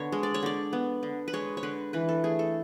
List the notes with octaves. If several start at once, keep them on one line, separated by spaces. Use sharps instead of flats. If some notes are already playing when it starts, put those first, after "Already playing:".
Already playing: D3 B3 C#5
G#3
D5
C#5
D3 D5
B3
D3
B4
G#3 C#5
C#5
D3 B4
E3 B4
A4
A3 G#4
A4